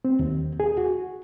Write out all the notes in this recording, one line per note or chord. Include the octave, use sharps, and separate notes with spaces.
C4
D#2
G#4
F#4